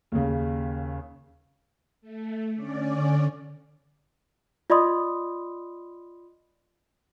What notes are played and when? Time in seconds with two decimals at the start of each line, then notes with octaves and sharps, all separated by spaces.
0.12 D#2 C#3
2.01 A3
2.55 D3 C#4 D5
4.70 F4 D5 D#5 B5 C6 D#6